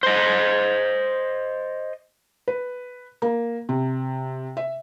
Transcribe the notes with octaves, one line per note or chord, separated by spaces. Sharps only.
C5 D#5
B4
A#3
C3
E5